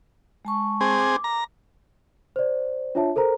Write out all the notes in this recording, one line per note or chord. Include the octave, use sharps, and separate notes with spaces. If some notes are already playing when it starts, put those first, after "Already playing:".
G#3 A5 C#6
C4 G#4
D6
A#5
C5 D5
D4 F4 C#5 E5 A5
A4 A#4 C5 A#5